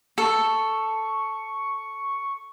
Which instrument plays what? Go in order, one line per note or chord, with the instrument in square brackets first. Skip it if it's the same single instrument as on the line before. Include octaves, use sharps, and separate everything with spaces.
[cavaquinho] A4 [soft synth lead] C#6